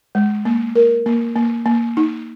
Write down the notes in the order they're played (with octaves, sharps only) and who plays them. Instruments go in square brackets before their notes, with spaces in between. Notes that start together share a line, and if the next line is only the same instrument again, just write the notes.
[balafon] G#3
A#3
A#4
A#3
A#3
A#3
D#4